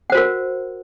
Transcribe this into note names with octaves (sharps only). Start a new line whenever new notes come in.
F#4 A#4 C5 F#5